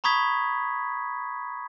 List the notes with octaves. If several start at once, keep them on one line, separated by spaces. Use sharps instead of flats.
A#5 B5 C#6 D#6 G#6 B6